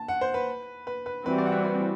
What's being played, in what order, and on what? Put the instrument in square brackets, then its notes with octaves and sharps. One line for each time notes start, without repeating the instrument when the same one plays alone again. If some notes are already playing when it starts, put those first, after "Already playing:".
Already playing: [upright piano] A5
F#5
C5
B4
B4
B4
[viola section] E3 G3 C4 F#4 [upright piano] B4
[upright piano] D5
F#5
E5
B4